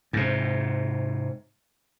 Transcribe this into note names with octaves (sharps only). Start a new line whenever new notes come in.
G#2 C3